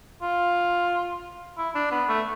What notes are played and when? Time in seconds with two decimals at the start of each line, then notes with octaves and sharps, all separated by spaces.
0.22 F4
1.58 E4
1.75 D4
1.92 B3
2.09 A3